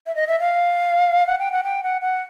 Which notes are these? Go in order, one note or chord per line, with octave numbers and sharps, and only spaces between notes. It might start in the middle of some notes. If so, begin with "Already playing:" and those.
E5
D#5
E5
F5
F#5
G5
F#5
G5
F#5
F#5